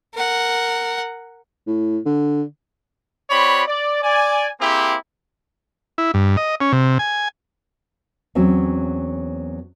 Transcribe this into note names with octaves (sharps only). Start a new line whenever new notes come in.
A#4 F#5
A2
D3
C4 F#4 C#5 D5 B5
D5
D5 G#5
A#3 C4 E4 G4 G#4 C5
E4
G2
D#5
C#4
C3
G#5
E2 F#3 C4 C#4